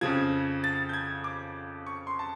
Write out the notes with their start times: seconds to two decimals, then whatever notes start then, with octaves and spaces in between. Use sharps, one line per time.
0.01 F2 C#3 F3 G#6
0.64 A6
0.89 G6
0.93 G#6
1.24 D6
1.87 C#6
2.07 C6
2.19 A5